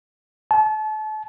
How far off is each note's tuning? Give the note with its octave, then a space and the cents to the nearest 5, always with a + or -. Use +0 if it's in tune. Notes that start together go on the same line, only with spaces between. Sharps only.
A5 -35